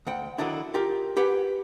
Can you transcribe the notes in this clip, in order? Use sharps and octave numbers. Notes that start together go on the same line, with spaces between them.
D2 F#5 G5
D3 D#3 F#3 D4 E4
F4 G4 A#4
G4 B4 F#5 G#5